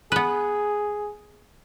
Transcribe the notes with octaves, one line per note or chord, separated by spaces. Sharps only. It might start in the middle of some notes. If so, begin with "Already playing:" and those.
B3 G#4 B4